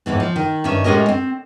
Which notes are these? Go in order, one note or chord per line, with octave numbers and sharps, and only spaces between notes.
D#2 G#2 E3 B3
F3
D#3
G2 D#3 C#4 E5
A2 G#3 C#4 G4 A#4 D#5
C4